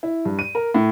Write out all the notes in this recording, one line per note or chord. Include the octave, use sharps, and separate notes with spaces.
E4
G2
D#7
A#4
A2